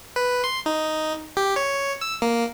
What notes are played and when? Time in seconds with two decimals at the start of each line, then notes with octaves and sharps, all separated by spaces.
0.16 B4
0.44 C6
0.66 D#4
1.37 G4
1.56 C#5
2.01 E6
2.22 A#3